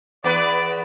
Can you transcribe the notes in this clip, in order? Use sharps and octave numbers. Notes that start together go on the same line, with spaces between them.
E2 B3 B4 D5